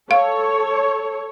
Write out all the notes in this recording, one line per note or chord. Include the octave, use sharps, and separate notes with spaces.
A4 C#5 F5